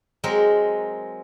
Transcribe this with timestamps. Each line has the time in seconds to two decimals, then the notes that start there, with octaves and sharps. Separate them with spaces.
0.24 F#3 G#3 C4 A#4